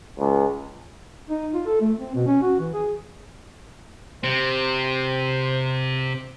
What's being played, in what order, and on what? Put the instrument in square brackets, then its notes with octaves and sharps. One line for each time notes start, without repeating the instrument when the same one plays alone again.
[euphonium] C#2
[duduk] D#4
F4
A4
A3
C4
B2
C#4
F#4
E3
G#4
[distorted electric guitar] C3 [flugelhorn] C5